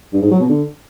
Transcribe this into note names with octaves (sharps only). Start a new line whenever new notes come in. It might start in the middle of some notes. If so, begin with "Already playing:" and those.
G2
G#2
F#3
B2
D3